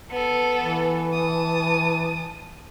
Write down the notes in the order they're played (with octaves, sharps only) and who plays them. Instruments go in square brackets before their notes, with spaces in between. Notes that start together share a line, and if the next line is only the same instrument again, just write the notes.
[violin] B3 A4
[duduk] E3
[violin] A5 D#6